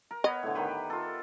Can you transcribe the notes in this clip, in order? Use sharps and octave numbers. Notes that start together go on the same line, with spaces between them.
A#4
B3 B4 C#5 D#5
A2 D3
D#3 G4 B4
F4 A4